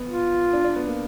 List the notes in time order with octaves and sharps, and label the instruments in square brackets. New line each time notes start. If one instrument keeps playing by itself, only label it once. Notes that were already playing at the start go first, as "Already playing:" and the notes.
Already playing: [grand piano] B3
[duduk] F4
[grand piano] D4
D4
B3
A#3